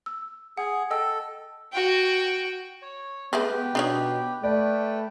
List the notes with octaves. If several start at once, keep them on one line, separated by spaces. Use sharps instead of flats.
E6
G#4 F#5
A4 D#5 G5 E6
F#4 G5
C#5
G#3 A3 B3 C4 G4 B4 G5
B2 D4 D#4 C#5
A3 B4 D5 G5